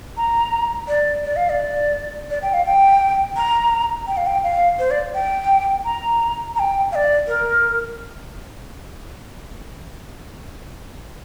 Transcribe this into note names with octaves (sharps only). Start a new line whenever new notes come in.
A#5
D5
D5
F5
D5
D5
G5
F5
G5
A#5
G5
F5
G5
F5
C5
D5
G5
A#5
A#5
G5
F5
D5
A#4